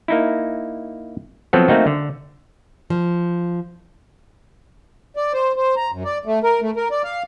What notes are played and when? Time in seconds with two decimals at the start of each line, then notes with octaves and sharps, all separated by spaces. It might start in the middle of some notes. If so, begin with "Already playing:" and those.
0.08 A#3 D#4 E4
1.53 F3 F#3 B3 C4 F#4 A4
1.68 A3 A#3 C4 D#4 F#4
1.87 D3
2.90 F3
5.16 D5
5.33 C5
5.56 C5
5.77 A#5
5.91 F#2
6.05 D5
6.25 A3
6.44 A#4
6.61 A3
6.76 A#4
6.91 D5
7.04 F5